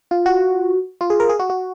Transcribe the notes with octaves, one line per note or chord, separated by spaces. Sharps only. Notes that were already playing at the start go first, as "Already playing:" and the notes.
F4
F#4
F4
G#4
A#4
G#4
F#4
F#4